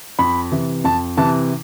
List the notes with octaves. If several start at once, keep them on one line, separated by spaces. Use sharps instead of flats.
F2 B5
C3 E3
F2 A5
C3 E3 A5